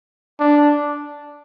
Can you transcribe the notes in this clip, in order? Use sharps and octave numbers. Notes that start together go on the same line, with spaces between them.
D4